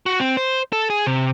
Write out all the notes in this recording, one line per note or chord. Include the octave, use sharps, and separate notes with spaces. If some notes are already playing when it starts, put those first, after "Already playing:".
F#4
C4
C5
A4
G#4
C3